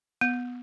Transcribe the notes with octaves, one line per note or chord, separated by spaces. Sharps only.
B3